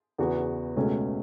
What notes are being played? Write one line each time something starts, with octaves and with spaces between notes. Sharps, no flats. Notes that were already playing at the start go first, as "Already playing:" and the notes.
E2 C#3 E3 B3 F#4
C#2 B2 A3 C#4